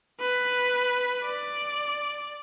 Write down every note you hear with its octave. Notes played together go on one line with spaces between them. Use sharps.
B4
D5